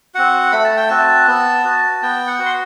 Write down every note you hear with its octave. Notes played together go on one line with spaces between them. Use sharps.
C4 F#4 F#5
A3 B5
A5
G5
C4 F#4 A5
B3
F#4
B3 G5
F#5
F#4
C6